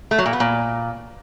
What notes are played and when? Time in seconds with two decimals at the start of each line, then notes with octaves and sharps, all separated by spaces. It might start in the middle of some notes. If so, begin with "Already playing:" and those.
0.11 A3
0.18 F#3
0.26 A#2
0.33 B3
0.40 A#2